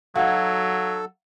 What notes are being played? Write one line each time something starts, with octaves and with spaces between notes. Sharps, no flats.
F#3 D#4 F#4 A4 F5 G#6